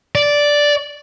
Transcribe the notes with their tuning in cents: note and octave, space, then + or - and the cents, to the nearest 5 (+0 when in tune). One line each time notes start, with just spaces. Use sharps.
D5 -5